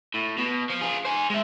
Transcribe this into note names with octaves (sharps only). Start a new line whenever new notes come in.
A2
B2
F3
F4 G#4
C5 G#5
G#3 E5